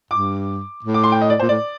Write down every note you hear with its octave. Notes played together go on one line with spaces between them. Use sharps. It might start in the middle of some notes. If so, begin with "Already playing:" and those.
G2 D6
A2
D6
C6
G5
D#5
D5
A#2 C5
A2 D5